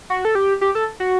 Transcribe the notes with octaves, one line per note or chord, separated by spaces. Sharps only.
F#4
A4
G4
G4
A4
F#4